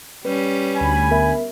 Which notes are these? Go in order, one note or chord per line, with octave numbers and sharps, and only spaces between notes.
G3 C#4 B4
D2 G#5 B5
B3 A#4 E5